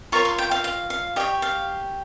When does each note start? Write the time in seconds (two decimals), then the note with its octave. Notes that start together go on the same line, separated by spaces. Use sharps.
0.12 F4 A#4 C#5 C#6
0.25 C6
0.38 G5
0.51 F5
0.64 F5
0.90 F5
1.16 G4 D#5
1.20 C#5
1.42 F5